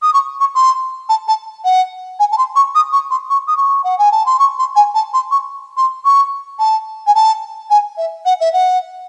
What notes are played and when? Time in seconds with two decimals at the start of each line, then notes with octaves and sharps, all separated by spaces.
0.02 D#6
0.14 C#6
0.40 C#6
0.55 C6
1.09 A5
1.28 A5
1.64 F#5
2.19 G#5
2.32 A5
2.38 C6
2.56 C#6
2.75 D#6
2.92 C#6
3.11 C6
3.30 C#6
3.47 D#6
3.57 C#6
3.84 F#5
3.99 G#5
4.12 A5
4.26 C6
4.39 C#6
4.59 C6
4.76 G#5
4.95 A5
5.14 C6
5.31 C#6
5.77 C6
6.05 C#6
6.59 A5
7.07 G#5
7.15 A5
7.70 G#5
7.97 E5
8.25 F#5
8.40 E5
8.53 F#5